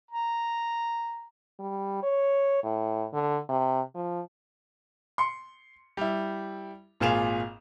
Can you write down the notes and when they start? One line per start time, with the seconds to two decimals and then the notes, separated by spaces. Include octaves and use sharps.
0.11 A#5
1.59 G3
2.03 C#5
2.63 A2
3.13 D3
3.49 C3
3.95 F3
5.18 C6 C#7
5.97 G3 E4
7.00 G#1 A#2 F4 G#4 E7 F7